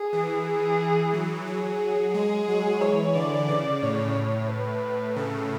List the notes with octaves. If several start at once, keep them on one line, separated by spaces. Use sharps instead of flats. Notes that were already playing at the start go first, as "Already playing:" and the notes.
Already playing: G#4
E3
G#4
F#3
F#3 G#4
G#3 G#4
F#3
E3 C#5
D3 D5
C#3
A2 C#5
B4
C#3 A4